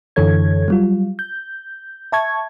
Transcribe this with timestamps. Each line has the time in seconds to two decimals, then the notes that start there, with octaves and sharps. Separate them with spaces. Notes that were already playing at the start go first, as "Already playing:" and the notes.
0.16 F#2 D3 E3 A4 C#5 G#6
0.68 F#3 G3 F4
1.19 G6
2.12 E5 A5 C#6 G#6